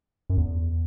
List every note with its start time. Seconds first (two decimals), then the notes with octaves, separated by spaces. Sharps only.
0.30 F#2
0.38 E2